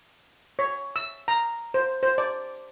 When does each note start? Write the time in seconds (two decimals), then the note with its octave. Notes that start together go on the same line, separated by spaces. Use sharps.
0.59 C#5
0.96 E6
1.28 A#5
1.74 C5
2.03 C5
2.18 D5